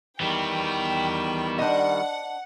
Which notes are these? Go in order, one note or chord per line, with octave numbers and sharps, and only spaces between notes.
D#3 E3 G3 B3 G5
D4 C5 D#5 F#5